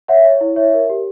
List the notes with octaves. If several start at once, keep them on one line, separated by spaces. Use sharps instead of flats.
C#5 E5 F#5
C#5
E4
C#5 E5
A#4
G4